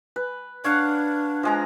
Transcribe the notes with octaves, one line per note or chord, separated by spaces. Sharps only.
B4
D4 C#5 F5 F#5
F3 G#3 A#5